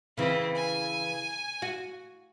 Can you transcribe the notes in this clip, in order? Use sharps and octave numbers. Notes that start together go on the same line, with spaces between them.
C#3 E3 C4
G#5
F#4